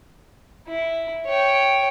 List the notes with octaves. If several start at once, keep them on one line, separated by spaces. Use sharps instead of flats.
E4
C#5 G5